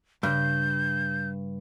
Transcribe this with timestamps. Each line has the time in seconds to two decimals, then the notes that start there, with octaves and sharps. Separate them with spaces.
0.23 G2 C#3 G6